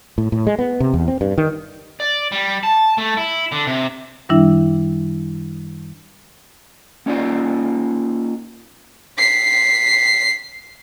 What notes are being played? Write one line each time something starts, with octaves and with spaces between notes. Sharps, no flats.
A2
A2
G#3
B3
C3
E2
C4
G2
D#3
D5
G3
A5
A3
E4
D3
C3
F#2 D#3 G3 D4 E4 E5
A#3 C#4 D#4 F4 D5 F5
B6 C7